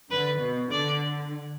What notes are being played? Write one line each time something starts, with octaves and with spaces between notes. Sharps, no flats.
D3 B4
B2
D3 D5